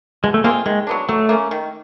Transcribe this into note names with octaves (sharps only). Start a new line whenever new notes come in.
B2 G#3
A3
G#3 A#3 C4 F4
D#3 G#3
F#3 B3 D4
F#3 A3
A#3 C#4
D#3